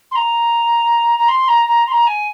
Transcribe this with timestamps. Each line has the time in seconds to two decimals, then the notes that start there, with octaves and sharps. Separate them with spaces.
0.11 C6
0.15 A#5
1.18 A#5
1.28 C6
1.48 A#5
1.67 A#5
1.87 C6
1.92 A#5
2.07 G#5